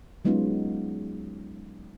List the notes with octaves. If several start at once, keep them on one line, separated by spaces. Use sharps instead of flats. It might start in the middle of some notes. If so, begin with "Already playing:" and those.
F#3 G#3 B3 C#4 D#4 F4